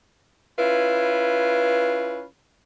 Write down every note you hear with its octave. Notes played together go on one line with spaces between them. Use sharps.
C#4 E4 F4 B4